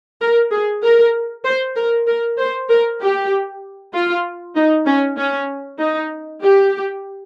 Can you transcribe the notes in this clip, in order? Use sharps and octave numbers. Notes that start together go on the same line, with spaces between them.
A#4
G#4
A#4
C5
A#4
A#4
C5
A#4
G4
F4
D#4
C#4
C#4
D#4
G4